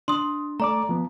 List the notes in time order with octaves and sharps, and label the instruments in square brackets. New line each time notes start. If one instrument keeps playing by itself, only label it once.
[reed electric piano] D4 [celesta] C6 D#6
[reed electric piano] A3 D5 D6 [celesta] A#5
[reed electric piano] F3 B3